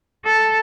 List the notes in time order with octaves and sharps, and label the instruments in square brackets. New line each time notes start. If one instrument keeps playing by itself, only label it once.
[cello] A4